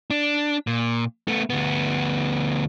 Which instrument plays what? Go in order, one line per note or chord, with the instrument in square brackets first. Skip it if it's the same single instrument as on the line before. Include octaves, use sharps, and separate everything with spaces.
[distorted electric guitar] D4
A#2
A3 B3
D2 B3